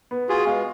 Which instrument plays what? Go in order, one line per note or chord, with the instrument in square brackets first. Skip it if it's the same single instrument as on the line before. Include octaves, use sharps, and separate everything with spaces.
[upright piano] B3
[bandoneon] F4 G#4 [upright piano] F#4
[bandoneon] G#3 B3 [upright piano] F5